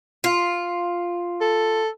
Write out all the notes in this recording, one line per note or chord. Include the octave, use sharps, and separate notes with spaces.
F4
A4